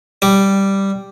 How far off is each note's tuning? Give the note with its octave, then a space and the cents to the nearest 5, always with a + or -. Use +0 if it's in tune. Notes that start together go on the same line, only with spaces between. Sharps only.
G3 +0 D6 +0